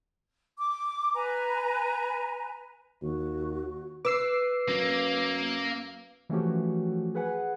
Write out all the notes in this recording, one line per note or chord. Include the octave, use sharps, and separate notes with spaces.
D6
B4 G#5 A#5
D#2 F#4
B4 D6 E6 C7
F#2 A#3
E3 F3 A3 C#4 F#4 G4
G#4 B4 F#5 G#5